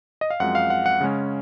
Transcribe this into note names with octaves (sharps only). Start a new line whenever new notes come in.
D#5
F5
F#2 F3 G#3 C4 F#5
F5
F#5
F#5
C#3 G#3 C#4